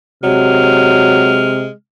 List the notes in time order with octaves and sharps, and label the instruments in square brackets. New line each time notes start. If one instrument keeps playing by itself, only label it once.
[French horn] C3 [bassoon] F#3 [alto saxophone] G#3 [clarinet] F6